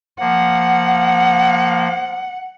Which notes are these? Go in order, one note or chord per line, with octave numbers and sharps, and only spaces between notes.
F3 A#3 F#5